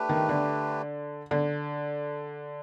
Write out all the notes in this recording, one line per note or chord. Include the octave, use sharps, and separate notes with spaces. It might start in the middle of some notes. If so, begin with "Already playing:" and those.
Already playing: A3 D4 G4 B4
D#3
D3
D3